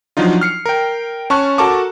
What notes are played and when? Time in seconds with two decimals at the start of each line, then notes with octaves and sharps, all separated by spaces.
0.17 F3 F#3 D4 D#4 F4
0.41 F6 C7 C#7
0.66 A#4 G5
1.30 C#4 A5 C#6 F#6
1.58 F#4 A4 A#4 A5 C#6 D6